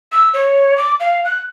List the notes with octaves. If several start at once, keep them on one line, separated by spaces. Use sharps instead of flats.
E6
C#5
D6
F5
F#6